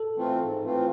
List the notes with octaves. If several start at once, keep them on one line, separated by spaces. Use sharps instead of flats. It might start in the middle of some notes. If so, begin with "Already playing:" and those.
Already playing: A4
E3 A3 C4 F4
G#2
E3 A3 C4 F4